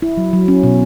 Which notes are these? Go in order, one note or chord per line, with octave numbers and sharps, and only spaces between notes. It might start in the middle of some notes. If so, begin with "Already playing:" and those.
E4
F#3
F#3
C#4
B2